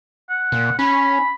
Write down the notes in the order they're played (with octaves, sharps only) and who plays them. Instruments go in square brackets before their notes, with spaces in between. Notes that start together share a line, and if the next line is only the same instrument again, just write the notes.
[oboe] F#5
[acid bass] A#2
[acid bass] C#4 [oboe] B5